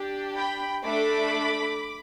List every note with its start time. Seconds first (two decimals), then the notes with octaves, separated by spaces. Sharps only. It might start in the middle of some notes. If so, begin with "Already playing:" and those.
Already playing: D4 G4
0.35 G5 B5
0.85 A3 D4 A4 B5 D6